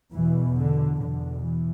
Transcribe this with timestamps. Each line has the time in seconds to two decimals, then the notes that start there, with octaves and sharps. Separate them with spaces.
0.13 E2 B2 E3
0.57 D3
0.99 E2 B2 D3
1.43 E3